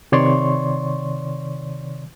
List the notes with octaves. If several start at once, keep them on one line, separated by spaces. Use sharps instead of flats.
C3 D#3 C#5 D5 C6 C#6